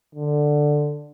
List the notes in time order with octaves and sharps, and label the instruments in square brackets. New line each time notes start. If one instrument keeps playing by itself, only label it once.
[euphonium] D3